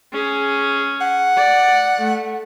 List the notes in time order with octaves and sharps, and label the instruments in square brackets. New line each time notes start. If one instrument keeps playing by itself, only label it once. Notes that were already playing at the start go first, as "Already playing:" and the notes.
[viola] C#4 G#4
[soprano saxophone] F#5
[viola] D5
A3